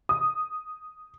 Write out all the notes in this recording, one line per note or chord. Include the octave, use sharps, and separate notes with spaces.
D#6